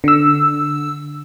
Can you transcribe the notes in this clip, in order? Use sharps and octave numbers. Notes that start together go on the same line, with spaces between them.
D3 E6